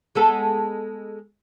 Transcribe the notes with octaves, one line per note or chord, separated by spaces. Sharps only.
G#3 B3 A4